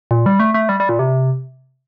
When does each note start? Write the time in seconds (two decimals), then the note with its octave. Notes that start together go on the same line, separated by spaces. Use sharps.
0.11 A#2
0.26 G3
0.40 A3
0.54 A3
0.69 G3
0.80 G3
0.89 A#2
0.99 C3